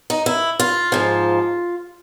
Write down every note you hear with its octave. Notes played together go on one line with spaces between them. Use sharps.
D#4
E4
F4
G#2 F3